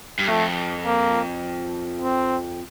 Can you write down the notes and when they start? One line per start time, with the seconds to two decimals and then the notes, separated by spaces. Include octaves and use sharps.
0.19 G2
0.28 F2 A3
0.86 A#3
2.01 C4